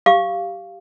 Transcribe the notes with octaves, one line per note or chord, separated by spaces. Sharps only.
G4 F5 D6